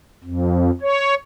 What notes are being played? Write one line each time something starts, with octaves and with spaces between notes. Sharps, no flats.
F2
C#5